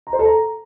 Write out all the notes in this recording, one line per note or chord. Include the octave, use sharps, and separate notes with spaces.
A#5
C5
A4
A#5